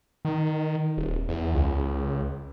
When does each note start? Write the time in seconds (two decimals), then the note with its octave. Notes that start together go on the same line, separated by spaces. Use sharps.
0.25 D#3
0.97 D#1
1.29 E2
1.54 C#2